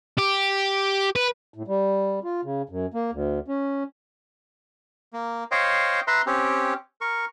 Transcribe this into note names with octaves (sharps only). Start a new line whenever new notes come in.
G4
B4
A2
G3
F4
C#3
F#2
A#3
D2
C#4
A#3
C5 C#5 D#5 F5 G5
B4 E5 A#5 C6
C4 C#4 G4
A#4 C#6